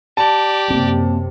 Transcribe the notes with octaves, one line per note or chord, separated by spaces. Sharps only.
G4 D5 A5
F#2 C3 A#3 C4